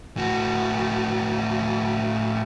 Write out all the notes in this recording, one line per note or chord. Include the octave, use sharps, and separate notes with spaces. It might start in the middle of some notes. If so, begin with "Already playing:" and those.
A2 F#4